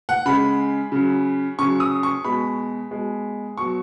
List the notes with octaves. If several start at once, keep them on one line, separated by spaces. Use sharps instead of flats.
F#5
C#3 G#3 B5
C#3 F#3
C#3 F#3 C#6
D#6
C#6
B2 G#3 B5
B2 G#3
B2 F#3 C#6